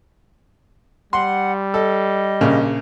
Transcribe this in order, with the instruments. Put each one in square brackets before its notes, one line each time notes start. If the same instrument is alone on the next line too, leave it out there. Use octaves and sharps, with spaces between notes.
[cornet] G3 [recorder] F#5 [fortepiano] C6
[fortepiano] A4 [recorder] D#5
[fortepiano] A#1 C#3 A#3